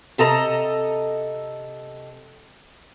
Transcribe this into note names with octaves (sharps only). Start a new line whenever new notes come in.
C3 A4 D#5 A#5